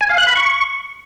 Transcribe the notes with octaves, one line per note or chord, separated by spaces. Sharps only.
G#5
F5
F#6
B5
C#6